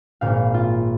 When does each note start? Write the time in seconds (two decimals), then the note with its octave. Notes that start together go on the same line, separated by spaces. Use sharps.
0.21 G#1 A#2 F5
0.54 F4